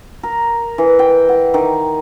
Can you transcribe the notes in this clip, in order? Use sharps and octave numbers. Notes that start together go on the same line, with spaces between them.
A#4
E3
G5
F#5
D#3